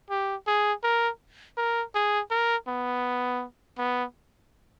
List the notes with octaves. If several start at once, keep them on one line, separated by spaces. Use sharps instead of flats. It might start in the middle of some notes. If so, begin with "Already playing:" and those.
G4
G#4
A#4
A#4
G#4
A#4
B3
B3